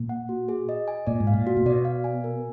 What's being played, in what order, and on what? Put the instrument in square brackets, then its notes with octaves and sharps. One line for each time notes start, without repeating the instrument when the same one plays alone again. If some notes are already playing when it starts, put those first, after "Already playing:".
Already playing: [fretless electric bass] A#2
[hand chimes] F#5
F#4
G#4
D#5
G#5
[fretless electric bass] A#2 [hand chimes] D5
[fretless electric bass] G#2
[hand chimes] F5
[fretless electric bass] A#2
[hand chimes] F#4
[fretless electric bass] A#2
[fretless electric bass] B2 [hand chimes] D5
[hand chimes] F5
G#5
A#4